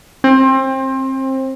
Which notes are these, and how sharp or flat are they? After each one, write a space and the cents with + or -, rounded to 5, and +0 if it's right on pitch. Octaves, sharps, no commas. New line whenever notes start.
C4 +25